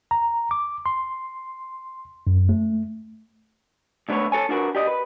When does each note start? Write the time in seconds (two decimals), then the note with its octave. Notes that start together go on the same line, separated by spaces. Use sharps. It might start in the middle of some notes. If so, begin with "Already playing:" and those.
0.11 A#5
0.51 D6
0.86 C6
2.27 F#2
2.49 A3
4.09 D2 D3 A3 B3 C#5
4.32 A4 C#5 G#5
4.49 D4 F4 F#4 A#4 B4
4.75 G4 D5 D#5
4.87 B4